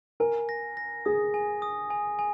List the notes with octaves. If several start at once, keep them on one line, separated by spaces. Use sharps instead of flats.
A#4 G#5
A#6
A#6
G#4 D#6
G#5
D#6
G#5
G#5